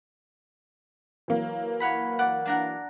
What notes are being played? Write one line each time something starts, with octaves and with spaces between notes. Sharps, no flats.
E3 F#3 A#3
C#5 F#5 B5
D5 F#5
D4 A#4 F#5